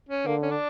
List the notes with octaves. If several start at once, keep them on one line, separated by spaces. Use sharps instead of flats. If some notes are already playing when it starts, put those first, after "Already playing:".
C#4
D3 A#3
C#4
D4